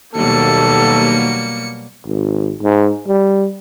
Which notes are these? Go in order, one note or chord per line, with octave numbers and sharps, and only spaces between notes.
D#2 B2 F#3 G3 A#3 A4 C#7
G#1
G#2
G3